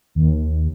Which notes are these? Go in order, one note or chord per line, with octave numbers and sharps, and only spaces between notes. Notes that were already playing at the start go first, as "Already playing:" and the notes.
D#2